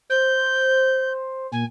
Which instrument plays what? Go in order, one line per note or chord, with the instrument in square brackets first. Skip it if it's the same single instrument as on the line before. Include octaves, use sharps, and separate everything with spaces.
[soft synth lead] C5 [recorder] G6
[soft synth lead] A#2 [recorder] G#5